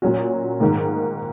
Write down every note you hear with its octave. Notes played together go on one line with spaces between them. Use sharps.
A#2 F#3 C#4 F#4
G#2 D#3 A#3